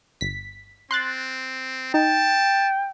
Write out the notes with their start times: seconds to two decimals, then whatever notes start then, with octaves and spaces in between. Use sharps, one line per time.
0.21 G1 B6
0.91 C4 C6 F#6 A6
1.94 D#4 G5 A5